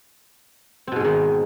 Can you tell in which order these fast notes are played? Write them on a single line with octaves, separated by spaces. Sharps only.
C4 B2 G#2 G#3 D#3